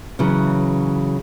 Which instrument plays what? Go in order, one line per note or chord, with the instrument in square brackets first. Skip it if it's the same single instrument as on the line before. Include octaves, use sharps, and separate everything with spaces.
[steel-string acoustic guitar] C#3 E3 F#3